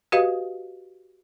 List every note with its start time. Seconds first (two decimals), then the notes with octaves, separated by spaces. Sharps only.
0.12 F#4 G4 B4 D#5 F5